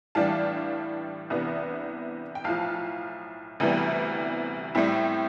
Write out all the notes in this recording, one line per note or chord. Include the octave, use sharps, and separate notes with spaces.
A2 E3 G3 D4 F5 A5
C2 C3 E3 B3 D4
G5
B1 A2 F3 F5 A5
D2 C3 E3 G3 B3
A2 G3 C4 E4